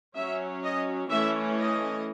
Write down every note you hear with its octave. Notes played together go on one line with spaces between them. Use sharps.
F#3 C#4 E5
D#5
E3 A3 C#4 E5
D#5